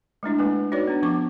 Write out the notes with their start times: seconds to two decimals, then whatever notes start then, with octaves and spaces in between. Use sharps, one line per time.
0.23 G#3 A3 D4 E4
0.38 G#3 A#3 B4 G#5
0.72 D#4 F#4 B4 C#5 D5
0.88 B3 D4
1.03 F3 B3 C#4 C#6 D6